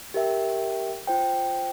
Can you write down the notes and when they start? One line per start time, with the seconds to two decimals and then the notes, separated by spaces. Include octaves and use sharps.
0.14 G4 A#4 E5 G5
1.07 F4 C5 G5